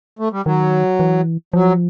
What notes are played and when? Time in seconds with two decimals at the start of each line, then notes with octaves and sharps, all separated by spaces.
0.19 A3
0.32 G3
0.46 D#3 F#3
1.00 E3
1.53 F3 F#3